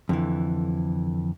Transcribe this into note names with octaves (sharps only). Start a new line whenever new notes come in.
F2 D3 E3